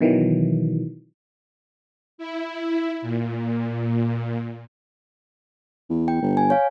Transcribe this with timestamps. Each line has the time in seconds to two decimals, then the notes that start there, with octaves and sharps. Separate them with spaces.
0.01 B2 D#3 E3 F#3
2.18 E4
3.02 A#2
5.90 E2
6.08 G5
6.21 G1
6.37 G#5
6.50 C#5 F5